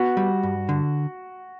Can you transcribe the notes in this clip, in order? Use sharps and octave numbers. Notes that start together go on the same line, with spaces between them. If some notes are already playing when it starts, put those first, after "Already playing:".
Already playing: B3 F#4
G3
G2
D3